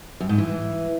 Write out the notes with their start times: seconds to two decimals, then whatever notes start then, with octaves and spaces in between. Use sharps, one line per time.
0.20 F#2
0.29 G#2
0.38 E3